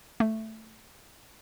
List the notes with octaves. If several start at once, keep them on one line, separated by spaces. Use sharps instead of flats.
A3